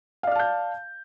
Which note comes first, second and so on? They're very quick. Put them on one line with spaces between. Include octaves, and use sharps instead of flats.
F5 D5 F6 A5 G6